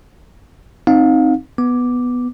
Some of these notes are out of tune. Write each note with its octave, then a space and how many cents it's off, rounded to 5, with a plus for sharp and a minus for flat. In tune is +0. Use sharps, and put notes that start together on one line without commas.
C4 +10 D#4 +0 F5 +30
B3 +0 D6 +0